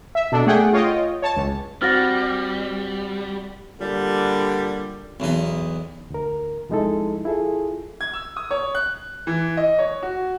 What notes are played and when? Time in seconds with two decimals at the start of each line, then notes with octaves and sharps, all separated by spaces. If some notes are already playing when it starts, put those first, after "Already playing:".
0.15 E5
0.32 B2 D4 A4
0.47 A3 G#4 F#5 G5
0.73 F4 C#5 D#5 G5
1.22 C#5 A5
1.36 C#2
1.81 G3 C4 F#4 F#5 F6 A6 A#6
3.80 A#2 D3 G3
5.20 B1 E2 D#4
6.10 D2 A#4
6.69 C2 F3 G#3 D#4 E4 A4
7.25 E4 F4 G#4 A4
8.01 G#6
8.13 E6
8.36 D#6
8.51 C#5
8.75 F#6
9.27 E3
9.57 D#5
9.79 C#5
10.03 F#4